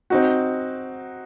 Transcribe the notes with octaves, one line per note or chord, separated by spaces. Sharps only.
C4 D#4 F#4